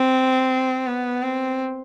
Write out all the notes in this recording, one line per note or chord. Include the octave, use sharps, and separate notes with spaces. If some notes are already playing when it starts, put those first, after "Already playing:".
Already playing: C4
B3
C4